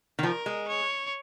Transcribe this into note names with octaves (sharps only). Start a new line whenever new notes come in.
D#3
F3 A#4
G#3
C#5